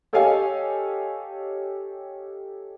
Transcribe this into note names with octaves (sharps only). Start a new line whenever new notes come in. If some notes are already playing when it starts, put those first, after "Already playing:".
G4 A4 C#5 D#5 F5 G#5